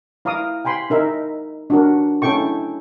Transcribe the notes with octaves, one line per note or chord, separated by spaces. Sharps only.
E4 F5 A#5 D6 D#6
G5 G#5 B5 C6
D#4 A#4 E5
D4 F#4 A#4
C#4 E4 A4 G5 C#6